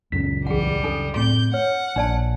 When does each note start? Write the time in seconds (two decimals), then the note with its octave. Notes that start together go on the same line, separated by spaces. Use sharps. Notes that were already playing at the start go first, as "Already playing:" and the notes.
0.12 C#2 F#2 B6
0.47 B1 E3 G3 G#4 F#5
0.84 C#3 D4 A4
1.16 A2 A3 C4 G6
1.54 C#5 F#5 F6
1.96 A#1 D4 D5 A5